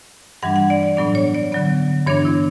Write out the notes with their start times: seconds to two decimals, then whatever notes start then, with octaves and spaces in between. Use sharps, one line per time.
0.43 G2 E3 G3 D4 F#5
0.56 F#5
0.70 D5
0.83 D5
0.97 A2 F#3 B3 D4 D5
1.15 C#5
1.34 D5
1.52 D3 F#3 B3
2.07 G2 E3 B3 D4 C#5
2.25 E4